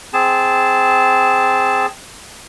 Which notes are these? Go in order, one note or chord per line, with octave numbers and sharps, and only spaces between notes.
C4 G#4 A5